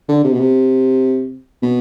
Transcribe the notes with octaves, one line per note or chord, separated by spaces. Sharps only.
D3
C3
B2
C3
B2